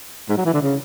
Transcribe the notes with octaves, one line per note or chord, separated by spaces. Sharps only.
G#2
F#3
E3
D3
C#3